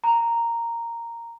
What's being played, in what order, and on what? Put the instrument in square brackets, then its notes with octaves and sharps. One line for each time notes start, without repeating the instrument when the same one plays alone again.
[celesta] A#5